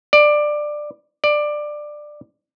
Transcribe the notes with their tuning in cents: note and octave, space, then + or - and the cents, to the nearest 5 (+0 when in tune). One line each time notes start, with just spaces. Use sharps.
D5 +15
D5 +15